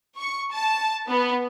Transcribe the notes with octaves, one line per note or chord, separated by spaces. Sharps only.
C#6
A5
B3